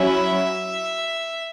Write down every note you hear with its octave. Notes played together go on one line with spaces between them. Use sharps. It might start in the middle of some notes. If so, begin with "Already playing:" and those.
Already playing: F#3 C#4 E4 E5